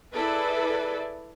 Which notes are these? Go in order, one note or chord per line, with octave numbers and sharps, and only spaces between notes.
E4 G#4 A4 B4 D5